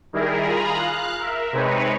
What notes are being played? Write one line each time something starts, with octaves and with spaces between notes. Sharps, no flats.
D#3 G3 E4 G#4 A#4
F4 G#4 A#5 B5
F5 F#6
A#4 E5
C3 G#3 C4 D#4 B4 C#5